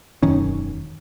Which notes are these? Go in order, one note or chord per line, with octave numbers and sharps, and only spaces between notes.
E1 F#2 D#3 C#4